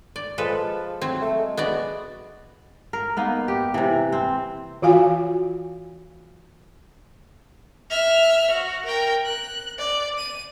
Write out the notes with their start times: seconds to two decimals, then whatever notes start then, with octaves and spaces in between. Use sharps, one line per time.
0.16 D5
0.38 F3 G#3 A4 B4
1.01 F#3 C4
1.21 A3
1.39 G#3
1.57 B3 F#4 D5
2.93 A#4
3.17 A#3 B3 D#4
3.48 G4
3.74 C3 E3
4.12 C4
4.82 E3 F4 F#4 F5 G#5
7.90 E5 F6
8.51 F#4
8.85 A#4 G5
9.25 F#6
9.78 D5
10.18 D#7